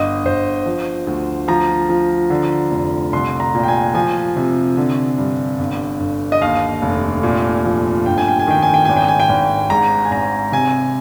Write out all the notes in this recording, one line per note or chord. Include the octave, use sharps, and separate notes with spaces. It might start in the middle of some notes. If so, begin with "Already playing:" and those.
Already playing: G1 D#5
G1 C5
F3
D2
F3 A#5
F3
D3
F1
C2 C6
A#5
A#2
G5
G#5
F3 G#5
C3
D3
G2
G1
G1
D#5
D#2 F5
F1
A#2
F3
G1 G5
G#5
G5
G#5
D#3 G5
G#5
G5
G#1 G#5
G5
G#5
G5
G#1
G#2 A#5
G#5
G#1 A#5
C3 G#5